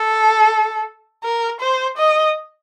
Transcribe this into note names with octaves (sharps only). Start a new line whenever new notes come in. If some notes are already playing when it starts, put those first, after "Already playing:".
Already playing: A4
A#4
C5
D#5